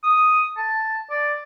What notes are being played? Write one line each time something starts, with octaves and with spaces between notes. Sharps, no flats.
D#6
A5
D5